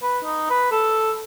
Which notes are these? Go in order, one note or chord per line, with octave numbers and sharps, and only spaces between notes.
B4
D#4
B4
A4